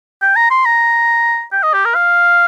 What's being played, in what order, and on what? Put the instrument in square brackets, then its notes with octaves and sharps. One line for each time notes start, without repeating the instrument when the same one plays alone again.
[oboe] G5
A#5
C6
A#5
G5
D#5
G4
A#4
F5